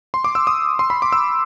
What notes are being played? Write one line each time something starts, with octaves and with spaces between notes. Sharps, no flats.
C6
D6
E6
D#6
C6
B5
D6
E6